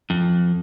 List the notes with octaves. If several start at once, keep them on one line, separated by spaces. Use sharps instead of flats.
F2